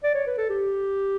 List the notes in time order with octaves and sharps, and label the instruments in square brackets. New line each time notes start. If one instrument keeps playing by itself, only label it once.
[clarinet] D5
C#5
B4
A4
G4